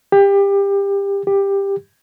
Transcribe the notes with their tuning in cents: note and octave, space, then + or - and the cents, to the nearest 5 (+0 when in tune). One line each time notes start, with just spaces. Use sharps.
G4 +25
G4 +15